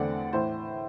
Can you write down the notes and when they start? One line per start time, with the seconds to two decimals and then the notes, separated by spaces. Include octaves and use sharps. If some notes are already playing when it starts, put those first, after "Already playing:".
Already playing: E2 D3 A3 C4 D5 F#5
0.33 A2 E3 C5